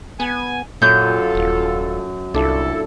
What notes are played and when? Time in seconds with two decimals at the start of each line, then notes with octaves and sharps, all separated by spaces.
0.20 B3 G#5
0.82 F#2 A#2 F4 F#4 A4 G6
1.35 D#1
2.34 C2 A#2 D4 E4 A4